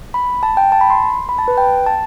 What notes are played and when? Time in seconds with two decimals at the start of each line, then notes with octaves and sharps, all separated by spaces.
0.14 B5
0.43 A5
0.57 G5
0.72 A5
0.81 B5
0.90 C6
1.29 B5
1.38 A5
1.48 B4
1.58 G5
1.86 A5